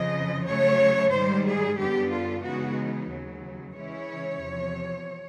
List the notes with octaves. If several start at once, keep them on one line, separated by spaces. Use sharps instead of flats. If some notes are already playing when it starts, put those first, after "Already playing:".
Already playing: F2 C#3 F3 D#5
C#3 F#3 A3 C#5
G#2 D#3 G3 C5
G#4
F#2 D3 G3 B3 D4 G4
F4
C#3 E3 G#3 B3 D#4 F#4
D#2 C#3 F#3
C#3 E3 G#3 C#4 E4 C#5
E2 C3 F3